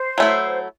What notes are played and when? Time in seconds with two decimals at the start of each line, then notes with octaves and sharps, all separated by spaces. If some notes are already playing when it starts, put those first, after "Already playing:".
Already playing: C5
0.18 F#3 A3 E4